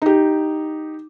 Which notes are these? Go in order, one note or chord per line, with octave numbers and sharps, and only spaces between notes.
D#4 G4